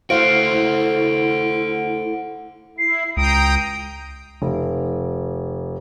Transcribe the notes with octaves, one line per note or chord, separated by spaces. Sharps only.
A3 E4 F#4 C5 F5 F#5 D7
E4 C7
C#2 G5 A#5 D#6 D7
F1